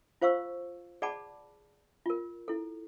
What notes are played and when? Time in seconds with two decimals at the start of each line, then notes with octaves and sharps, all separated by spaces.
0.21 F4 C5 F5 C#6 E6
1.02 G#4 D5 F#5 A5 B5 D6
2.06 F4 A#4
2.48 E4 A4